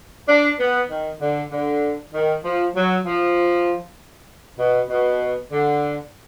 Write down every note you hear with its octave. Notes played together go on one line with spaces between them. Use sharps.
D4
B3
D#3
D3
D3
D#3
F3
F#3
F3
B2
B2
D3